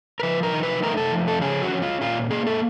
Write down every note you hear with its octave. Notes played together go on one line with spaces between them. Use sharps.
A#4
F3 B4
A#4
D#4
B4
A3 A#4
A4
F3
A4
C#4 G#4
F#4
C#4
F4
A#2 F4
A#3 G#4
A4